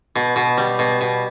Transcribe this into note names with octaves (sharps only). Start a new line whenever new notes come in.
B2
B2
G3
B2
B2